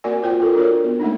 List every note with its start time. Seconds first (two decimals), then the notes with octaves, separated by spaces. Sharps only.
0.04 A#3 C4 F#4 A#4 D5 G#5
0.23 F4 C5 G5
0.40 F4 A4 A#4
0.55 D4 F4 F#4 A#4 C#5 D5
0.84 B3
1.00 A3 A#3 D4 D#4